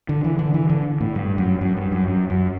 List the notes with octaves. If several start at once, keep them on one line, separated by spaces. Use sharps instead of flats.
D3
E3
D3
E3
D3
A2
G2
F#2
F#2
G2
F#2
F#2
F#2